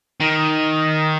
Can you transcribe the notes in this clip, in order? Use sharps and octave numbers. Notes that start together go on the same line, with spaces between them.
D#3